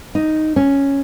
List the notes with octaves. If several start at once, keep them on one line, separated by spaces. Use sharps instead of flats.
D#4
C#4